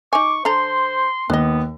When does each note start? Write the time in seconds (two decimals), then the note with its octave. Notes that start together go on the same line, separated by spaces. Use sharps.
0.13 D#4 G#5 C#6 D6
0.45 D3 A4 C5 A#5 C6
1.30 D#2 B3 B4 D#5